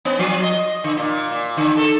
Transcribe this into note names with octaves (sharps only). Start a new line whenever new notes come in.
B3
F3
D#5
D3
A#2
A#2
D3
A4